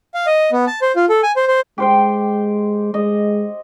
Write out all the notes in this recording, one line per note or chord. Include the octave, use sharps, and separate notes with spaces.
F5
D#5
B3
A5
C5
F4
A4
G#5
C5
C5
G#3 G4 C5 G5
G#3 D#5